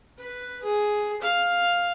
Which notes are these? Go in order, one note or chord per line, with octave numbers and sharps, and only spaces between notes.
B4
G#4
F5